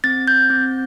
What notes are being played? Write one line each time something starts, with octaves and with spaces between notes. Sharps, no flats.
C4 A6
G6
C4